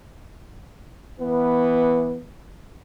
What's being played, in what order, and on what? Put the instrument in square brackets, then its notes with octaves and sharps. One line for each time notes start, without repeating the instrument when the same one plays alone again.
[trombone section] E3 B3